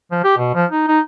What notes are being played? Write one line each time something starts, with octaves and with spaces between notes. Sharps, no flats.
F3
G4
B2
F3
D#4
D#4